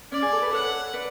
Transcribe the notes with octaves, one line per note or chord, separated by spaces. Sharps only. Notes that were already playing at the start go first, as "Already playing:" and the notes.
C#4 D5
G#4
A4
B4
A4 C#5 F#5
B4 D5